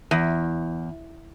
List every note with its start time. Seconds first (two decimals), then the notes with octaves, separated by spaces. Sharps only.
0.11 E2